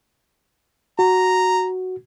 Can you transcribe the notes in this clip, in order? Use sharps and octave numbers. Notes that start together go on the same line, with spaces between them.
F#4 A#5